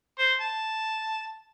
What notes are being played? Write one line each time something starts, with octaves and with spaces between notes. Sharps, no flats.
C5
A5